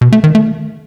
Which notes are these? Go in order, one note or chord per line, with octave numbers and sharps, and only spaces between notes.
B2
A3
D#3
A3